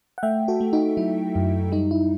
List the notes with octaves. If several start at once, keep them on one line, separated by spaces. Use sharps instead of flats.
F#5
A3 E5 G5
F#4 A4
A3
D#4 F#4
F#3 E4
F#2
G3 D#4
E4